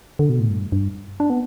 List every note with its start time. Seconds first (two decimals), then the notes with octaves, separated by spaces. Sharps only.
0.19 D3
0.29 B2
0.40 A2
0.50 G2
0.72 G2
1.20 D4
1.30 B3